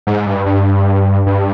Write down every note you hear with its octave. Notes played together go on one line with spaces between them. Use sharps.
G#2
G2
G2
G2